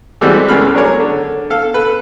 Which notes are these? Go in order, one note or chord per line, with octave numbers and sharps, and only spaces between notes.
E3 G3 G#3 C4 F#4 A4
C#2 C#3 A3 B5 F6
F#3 D4 G#4 A#4 C#5
D3
A4 F5
A4 B4